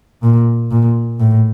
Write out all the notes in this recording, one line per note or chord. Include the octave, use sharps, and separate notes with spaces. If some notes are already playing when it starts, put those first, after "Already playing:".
A#2
A#2
A2